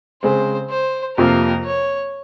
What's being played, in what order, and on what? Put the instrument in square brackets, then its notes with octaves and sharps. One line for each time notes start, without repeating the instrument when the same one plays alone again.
[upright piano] C#3 G#3 C4 [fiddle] C5
[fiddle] C5
[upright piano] F2 C3 F3 A#3 F4 [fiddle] A#4
[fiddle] C#5